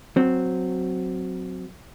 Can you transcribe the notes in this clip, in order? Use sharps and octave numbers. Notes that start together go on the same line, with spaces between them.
F#3 C4